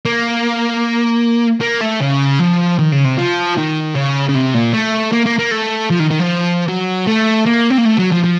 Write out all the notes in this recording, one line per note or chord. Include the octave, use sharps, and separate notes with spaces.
A#3
A#3
A3
C#3
F3
D#3
C#3
C3
F3
D#3
C#3
C#3
C3
A#2
A3
A#3
A#3
A#3
A3
F3
D#3
D#3
F3
F#3
A3
A#3
C4
A#3
A3
F#3
F3
F3